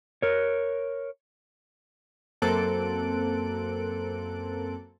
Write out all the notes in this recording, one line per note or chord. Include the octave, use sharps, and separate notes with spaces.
A#4 C#5
F#2 A#3 C4 A4 F#6 D7